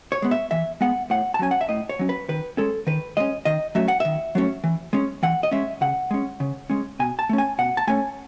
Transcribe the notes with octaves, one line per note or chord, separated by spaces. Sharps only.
C#5
G#3 B3
E5
E3 E5
G#3 B3 F#5
A2 F#5
A5
F#3 C#4 G#5
F#5
E5
A2 D#5
C#5
F#3 C#4
B4
D#3 B4
G#3 C#4 A4
D#3 B4
G#3 C#4 D#5
D#3 D#5
F#3 A3 C#4 E5
F#5
D#3 E5
F#3 A3 C#4
E3
G#3 C#4
E3 F#5
D#5
G#3 C#4 E5
C#3 F#5
G#3 C#4
C#3
G#3 C#4
B2 G#5
A5
A3 C#4
G#5
B2 F#5
A5
A3 C#4 G#5